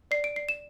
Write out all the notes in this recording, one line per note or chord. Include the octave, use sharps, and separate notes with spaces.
D5 C7
D7
D5 C7
E7